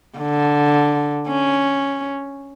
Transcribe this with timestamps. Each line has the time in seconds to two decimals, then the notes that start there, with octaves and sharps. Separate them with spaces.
0.18 D3
1.28 C#4